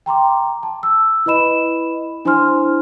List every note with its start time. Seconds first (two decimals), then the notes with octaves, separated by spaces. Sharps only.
0.06 G5 A#5 C6 D6
0.63 A5
0.83 E6
1.26 E4 B4 D#5 B5 E7
2.25 D4 E4 C5 G#5 C6 F6